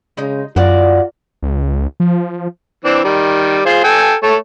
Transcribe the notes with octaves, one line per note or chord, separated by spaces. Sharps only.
C#3 G#3 D#4
F#2 F4 F#4 A#4 D5
C#2
F3
E3 C4 D4
D#3 G3
F4 G#4 C5
A4 G5 G#5
A3 C#5 A5